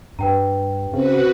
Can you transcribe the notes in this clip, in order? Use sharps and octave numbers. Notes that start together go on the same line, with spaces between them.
G2 B4 G5 A#5
C#3 C4 F#4 B4